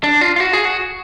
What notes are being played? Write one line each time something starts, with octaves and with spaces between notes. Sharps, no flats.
D4
F4
F4
F#4
G#4
F#4